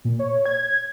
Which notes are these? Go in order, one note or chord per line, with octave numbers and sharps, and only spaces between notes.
A#2
C#5
G#6